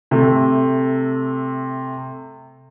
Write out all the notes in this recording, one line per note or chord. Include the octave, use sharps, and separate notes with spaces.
C3 A3